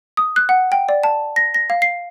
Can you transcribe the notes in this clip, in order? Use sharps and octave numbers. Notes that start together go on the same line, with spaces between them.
D#6
F#6
F#5
G5
D5
A5
A#6
A#6
F5
C7